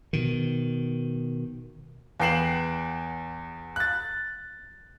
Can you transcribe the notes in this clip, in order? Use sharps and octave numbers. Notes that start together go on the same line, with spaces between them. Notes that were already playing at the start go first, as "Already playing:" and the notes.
B2 D#3
E2 B3 G5 C7 E7 F#7
F#6 A6